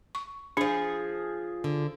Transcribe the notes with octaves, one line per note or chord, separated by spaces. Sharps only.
C#6
F3 D4 G#4
D3